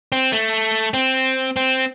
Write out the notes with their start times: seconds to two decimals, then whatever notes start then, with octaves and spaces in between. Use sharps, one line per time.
0.12 C4
0.32 A3
0.94 C4
1.56 C4